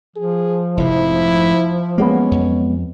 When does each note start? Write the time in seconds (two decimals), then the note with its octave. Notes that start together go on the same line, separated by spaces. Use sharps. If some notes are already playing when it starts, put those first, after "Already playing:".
0.16 F3 G#4
0.77 F1 G#2 C3 E4
1.98 F#3 G#3 A#3 B3 C#4
2.31 F2